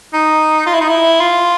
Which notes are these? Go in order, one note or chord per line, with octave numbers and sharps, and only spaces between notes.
D#4
F4
E4
D#4
E4
F4